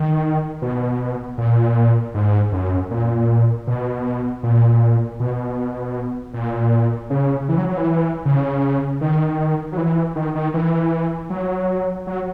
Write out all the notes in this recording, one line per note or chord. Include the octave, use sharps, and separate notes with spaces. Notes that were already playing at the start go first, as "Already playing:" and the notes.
Already playing: D#3
B2
A#2
G#2
F#2
A#2
B2
A#2
B2
A#2
C#3
E3
F#3
F#3
E3
C#3
D#3
F#3
E3
D#3
D#3
E3
F#3
F#3